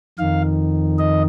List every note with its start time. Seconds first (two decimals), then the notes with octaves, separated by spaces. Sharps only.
0.18 F2 D#3 F5
0.99 D#5